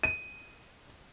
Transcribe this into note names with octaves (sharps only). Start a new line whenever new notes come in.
D#7